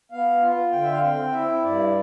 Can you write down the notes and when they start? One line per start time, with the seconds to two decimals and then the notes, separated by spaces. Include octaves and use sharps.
0.12 B3 F5
0.42 F4
0.72 D3 G5
0.83 E5
0.92 F5
1.02 C4 G5
1.32 E4 E5
1.62 G2 D5